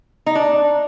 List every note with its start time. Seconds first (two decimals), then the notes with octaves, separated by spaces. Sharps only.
0.26 D#4
0.35 D4